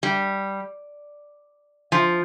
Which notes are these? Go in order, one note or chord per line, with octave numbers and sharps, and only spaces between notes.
G3
F3